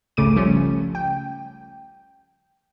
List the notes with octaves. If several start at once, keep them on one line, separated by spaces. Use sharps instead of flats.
G#1 C#2 C#3 A3 D6 D#7
C#3 F3 G3 A3 C#4
G5